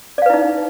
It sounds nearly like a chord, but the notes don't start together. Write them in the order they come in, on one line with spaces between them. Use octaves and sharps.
D5 F5 B4 E4 D#4